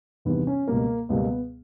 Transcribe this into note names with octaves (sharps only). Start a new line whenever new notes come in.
E2 C3 D#3 G3 B3
C#4
C#2 B2 G3 A#3
C#2 B2 G3 A#3 B3